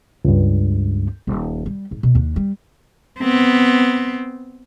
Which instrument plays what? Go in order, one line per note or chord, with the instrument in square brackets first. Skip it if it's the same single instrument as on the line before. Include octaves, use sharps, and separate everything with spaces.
[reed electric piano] C#2 G2
[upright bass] D#1
G3
G#2
B2
D#2 D4
G3
[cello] B3 C4